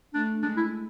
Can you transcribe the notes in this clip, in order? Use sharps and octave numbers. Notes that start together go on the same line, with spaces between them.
A3 D4
G#3 D4
E4